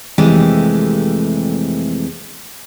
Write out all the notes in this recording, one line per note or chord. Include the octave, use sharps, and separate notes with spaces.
F2 C3 E3 G#3 A3 G4